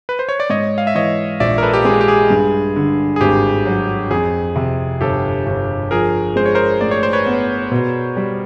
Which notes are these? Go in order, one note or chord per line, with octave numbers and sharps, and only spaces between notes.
B4
C5
C#5
D5
G#2 C#5 D#5
F5
E5
E3 C#5 D#5
A#1 D5 E5
A#4
A4 B4
G4
G#3 G#4
G4
G#4
G2
D3
G#4
G#1 G4
F#3
F2 G#4
C3
G1 G4 A4
G1
F3 G#4 A#4
G#3 C5
C#5
A#4 C5
A2 D5
C#5
C5
B4 C#5
B3
B2
G3